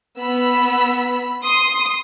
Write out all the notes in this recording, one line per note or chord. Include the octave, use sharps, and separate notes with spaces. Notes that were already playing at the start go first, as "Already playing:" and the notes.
B3 B5 E6
C6 D#6